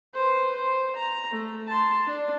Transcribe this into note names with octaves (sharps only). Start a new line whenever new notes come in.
B4 C5
C5
A#5
A3
A5 C6
D4